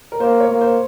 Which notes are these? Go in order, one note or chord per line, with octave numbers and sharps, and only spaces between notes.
A#4
A#3 C5
C#5
A#3
C5